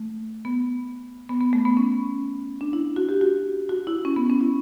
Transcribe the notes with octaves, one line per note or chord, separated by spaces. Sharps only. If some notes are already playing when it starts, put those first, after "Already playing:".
Already playing: A3
B3
B3
B3
A3
B3
C#4
D4
E4
F#4
G4
F#4
F#4
E4
C#4
B3
C#4
E4